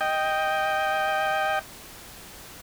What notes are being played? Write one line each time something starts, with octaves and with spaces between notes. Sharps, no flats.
D#5 G5